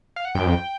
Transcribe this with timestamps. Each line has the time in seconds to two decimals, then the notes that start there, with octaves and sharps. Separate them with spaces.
0.16 F5
0.25 F#5
0.35 F#2 G5
0.46 F2